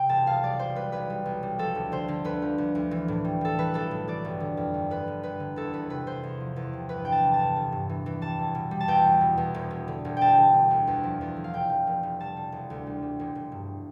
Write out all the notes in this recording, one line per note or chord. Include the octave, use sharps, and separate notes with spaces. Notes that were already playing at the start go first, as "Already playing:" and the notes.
Already playing: C3 G5
E1 A5
B1 F5
G3 D5
B1 C5
G3 B4
B1 B4
G3
B1
G3
F3 A4
D2
D3 C5
D3
D2 B4
F3
D2
D2
E3
A2
G3
A2 A4
E3 B4
B1 A4
A2
E3 D5
G1
D3
F2
G1
G1 B4
G1
G1 B4
D3
E2 A4
E2 B4
C3 B4
E2 C5
E2
F3
E2
C3
G1 B4
E3 G5
A5
G1
A5
G1
G1
G2
E3
E3
G3 A5
E2
B2
G3
A5
E2 G5
G3
B2
E2
E1
E1
D3
E1
E1 G5 A5
D3
D3
D2
E2
F3
E2
D3
F5
F1 G5
F1
F1
F1
G3 A5
G3
E1
D2
G3
G3
E1
E1
G2